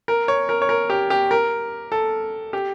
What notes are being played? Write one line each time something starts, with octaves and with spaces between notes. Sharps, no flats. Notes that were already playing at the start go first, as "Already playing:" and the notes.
A#4
C#5
A#4
C#5
A#4
G4
G4
A#4
A4
G4